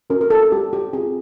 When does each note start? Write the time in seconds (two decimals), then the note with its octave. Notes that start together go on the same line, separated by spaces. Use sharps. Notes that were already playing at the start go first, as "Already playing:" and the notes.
0.10 C#4 F#4 A#4
0.21 A#4
0.30 A4
0.52 G#3 G4
0.73 G4
0.93 C4 F4 G#4